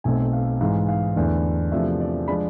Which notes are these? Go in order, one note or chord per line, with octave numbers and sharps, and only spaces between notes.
B1 B2 A3 C4 G#5
F5
G#2 E3 G#3 F5
F5
E2 D3 A3 D4
E2 C3 F3 A3 D4 E5
D5
F3 G#3 D4 B5